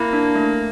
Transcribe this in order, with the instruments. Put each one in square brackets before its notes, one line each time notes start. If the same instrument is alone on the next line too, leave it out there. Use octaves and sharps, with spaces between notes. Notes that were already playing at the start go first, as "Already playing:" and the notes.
Already playing: [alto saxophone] A#3 [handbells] E4
[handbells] D4
A3